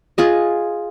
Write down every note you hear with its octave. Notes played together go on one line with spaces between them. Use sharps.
F4 G#4 D#5